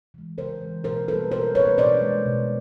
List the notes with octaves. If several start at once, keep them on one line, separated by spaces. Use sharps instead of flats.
E3 G#3
C#3 A#4 C5
E3 G#3
B2 A#4 C5
G3 A#3 A4 B4
B2 A#4 C5
G3 A#3 B4 C#5
B2 C5 D5
G#3
B2